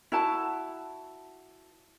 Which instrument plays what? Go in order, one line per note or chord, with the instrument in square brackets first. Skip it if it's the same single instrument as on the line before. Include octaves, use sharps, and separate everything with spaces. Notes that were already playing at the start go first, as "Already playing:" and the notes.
[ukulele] E4 F#4 A5